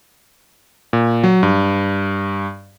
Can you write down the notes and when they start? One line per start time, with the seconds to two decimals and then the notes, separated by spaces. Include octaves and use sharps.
0.93 A#2
1.24 F#3
1.43 G2